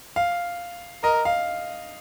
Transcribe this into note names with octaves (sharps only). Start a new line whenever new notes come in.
F5
A#4 D#5
F5